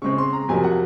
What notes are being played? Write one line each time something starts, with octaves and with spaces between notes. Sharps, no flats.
C#3 G#3 C4 C#6
C6
A#5
F2 C3 F#3 A#3 G#5
F#5